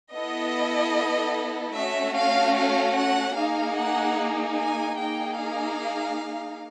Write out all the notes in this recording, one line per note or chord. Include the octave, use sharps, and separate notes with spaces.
B3 E4 A4 D#5
A3 C#4 F#4 E5
F5
F5
F#5
A#3 D#4 G#4 F5
F#5
G#5
A#3 D#4 G#4 G5
F5